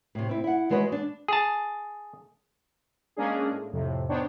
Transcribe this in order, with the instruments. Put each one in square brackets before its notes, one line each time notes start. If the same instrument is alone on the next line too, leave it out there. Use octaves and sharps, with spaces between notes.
[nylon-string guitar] A2 C3
C4 E4
E4 F#5
E3 G#3 F#4 B4 C#5
D4
[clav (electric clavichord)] G#4 A5
[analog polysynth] G#3 A#3 C#4 D4 G#4
A2
F2 A2 C3
B3 D4 D#4 C5 C#5 G5